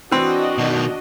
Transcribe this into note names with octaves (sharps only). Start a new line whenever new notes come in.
E3 C4 D4 F#4 D#5
B2 D#3